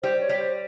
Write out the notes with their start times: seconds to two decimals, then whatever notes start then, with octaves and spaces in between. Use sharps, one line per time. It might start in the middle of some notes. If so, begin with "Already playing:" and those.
0.03 G3 G4 C5
0.21 C#5
0.29 G3 G4
0.39 C5